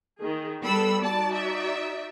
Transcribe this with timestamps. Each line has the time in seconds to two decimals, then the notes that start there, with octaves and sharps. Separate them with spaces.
0.20 D#3 G#4
0.61 G3 B3 A4 B5 E6
1.03 D#4 F#4 D5 A5
1.33 E5